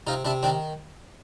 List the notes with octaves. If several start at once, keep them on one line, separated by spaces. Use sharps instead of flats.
C3 D#4 F4
C3 D4 E4
D#3 C4 D4